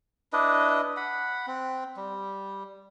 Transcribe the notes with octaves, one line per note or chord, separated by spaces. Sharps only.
D4 E4 B4 D#5
F#5 B5
C4
G3